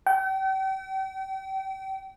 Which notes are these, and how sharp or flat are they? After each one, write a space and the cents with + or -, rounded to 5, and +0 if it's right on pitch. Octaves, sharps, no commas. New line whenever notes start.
G5 -40